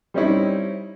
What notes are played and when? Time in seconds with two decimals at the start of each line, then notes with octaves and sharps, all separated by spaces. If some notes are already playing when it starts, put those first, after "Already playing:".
0.14 G3 C4 C#4 D#4 E4